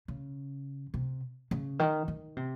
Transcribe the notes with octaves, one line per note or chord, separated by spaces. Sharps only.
C#3
C3
C#3
D#3
D#3
C3